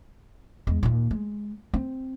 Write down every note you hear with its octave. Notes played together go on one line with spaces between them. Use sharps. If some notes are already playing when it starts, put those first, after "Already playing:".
E2 G#3
D#2 A#2
G#3
C4